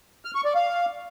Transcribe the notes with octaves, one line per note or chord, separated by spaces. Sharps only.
F6
C#6
D5
F5